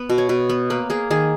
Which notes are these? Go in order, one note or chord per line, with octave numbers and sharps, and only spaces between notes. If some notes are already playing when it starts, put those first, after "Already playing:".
Already playing: B3 B4
B2
C#5
B2 B4
B3
A#3 B4
A#3 G#4
D#3 G#4